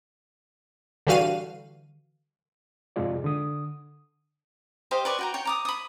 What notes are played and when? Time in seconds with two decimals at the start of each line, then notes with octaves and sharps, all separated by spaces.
1.07 D3 E3 G3 F#4 F5 D#7
2.96 F2 G#2 C3 G#3 F4 D5
3.24 D3 D#6
4.91 G4 C5 D#5 F5
5.05 B4 D5 C#6 D6
5.19 F#4 G5 A#5
5.34 C#5 G5
5.45 A#5 D6 D#6
5.65 B5 D#6